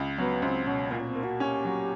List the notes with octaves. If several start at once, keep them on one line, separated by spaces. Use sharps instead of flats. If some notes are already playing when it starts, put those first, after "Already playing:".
Already playing: C#2
F#3 B3
C#2 C4
B2 C#4
A#2 A#3
C#4
C4
A#3
F#4
C#4 G4
F#3